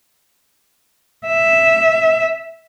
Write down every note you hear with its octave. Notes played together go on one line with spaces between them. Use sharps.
E5